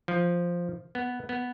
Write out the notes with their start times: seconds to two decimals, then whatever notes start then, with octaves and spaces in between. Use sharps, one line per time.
0.08 F3
0.95 B3
1.29 B3